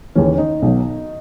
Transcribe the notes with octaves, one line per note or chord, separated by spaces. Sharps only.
D#2 C#3 E3 C#4
D#3 D#4
B1 B2 F#3